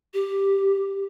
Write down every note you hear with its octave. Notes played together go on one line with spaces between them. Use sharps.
G4